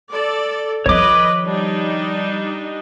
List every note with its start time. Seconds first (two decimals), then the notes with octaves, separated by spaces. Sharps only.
0.10 A4 D5
0.86 D#3 F3 B4 C#5 D#5 B5 D6
1.44 G3 D4 D#4